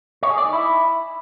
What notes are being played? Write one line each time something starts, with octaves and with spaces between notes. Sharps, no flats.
C#5
G#4
D5
D#4
E4